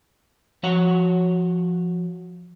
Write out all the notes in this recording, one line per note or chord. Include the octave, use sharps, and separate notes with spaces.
F3 F#4 C#5 F#5